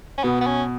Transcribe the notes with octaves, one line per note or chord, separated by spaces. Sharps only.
C#4
B2 B3
B3
C#4